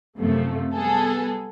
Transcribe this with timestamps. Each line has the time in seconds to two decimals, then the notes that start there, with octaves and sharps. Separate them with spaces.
0.18 F#2 C3 F3 A3
0.73 G3 B3 G#4 A4